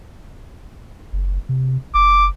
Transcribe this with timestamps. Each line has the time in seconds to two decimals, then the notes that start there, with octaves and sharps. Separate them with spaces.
1.13 F#1
1.49 C3
1.94 F#1 D6